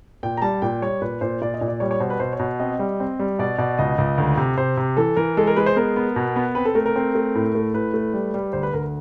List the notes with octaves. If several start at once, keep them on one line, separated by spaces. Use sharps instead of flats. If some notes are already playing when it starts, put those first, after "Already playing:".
A#2 G5
A#5
G3 A5
A#2 G5
G3 C#5
A#2 B4
A#2 C5
A#2 D5
D#5
A#2
D5
G3 C#5
C#5
B2 C5
B4
B2 C5
C#5
B2
C4 D#5
G3
C4
G3
B2 D5
B2 D5
C#2 D#5
C#2
D2
C3
C3 C5
C3
E3 A4
E3 A#4
G#3 A4
A#4
G#3 B4
C5
B3 A#4
B3
B2
B3
C4 B4
A4
A3 A#4
A#4
C4
A3
A2
A3
A2 B4
A3
G3
G3
D2 C5
B4
D2 A#4